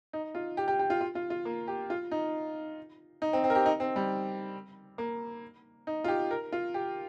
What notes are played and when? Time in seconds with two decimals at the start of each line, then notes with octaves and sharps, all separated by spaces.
0.13 D#4
0.35 F4
0.57 G4
0.68 G4
0.79 G4
0.90 F4
1.01 F4
1.15 F4
1.30 F4
1.45 A#3
1.68 G4
1.90 F4
2.11 D#4
3.22 D#4
3.33 C4
3.44 C4
3.50 A#4
3.55 G4
3.66 D#4
3.80 C4
3.96 G3
4.98 A#3
5.87 D#4
6.04 F4
6.08 G4
6.31 A#4
6.52 F4
6.74 G4